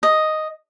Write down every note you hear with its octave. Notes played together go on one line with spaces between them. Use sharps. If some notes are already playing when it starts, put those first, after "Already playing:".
D#5